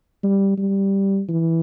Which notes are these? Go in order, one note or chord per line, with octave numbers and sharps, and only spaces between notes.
G3
G3
E3